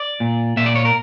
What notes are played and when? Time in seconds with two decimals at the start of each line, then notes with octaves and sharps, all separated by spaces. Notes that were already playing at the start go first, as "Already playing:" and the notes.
Already playing: D5
0.20 A#2
0.57 A#2 E5
0.66 D5
0.75 C#5
0.85 A#4